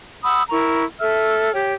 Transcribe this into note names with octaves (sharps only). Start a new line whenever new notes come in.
F#5 B5 D#6 E6
E4 A#4 A#5 C#6
A4 E5 E6 F6
G4 C#5 G5